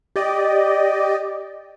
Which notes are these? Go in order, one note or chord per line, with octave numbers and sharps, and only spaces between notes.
G4 D5 D#5